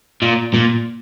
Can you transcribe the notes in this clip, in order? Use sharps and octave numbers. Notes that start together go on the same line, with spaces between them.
A#2
A#2